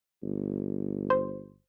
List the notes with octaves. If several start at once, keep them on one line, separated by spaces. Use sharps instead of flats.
G1
C5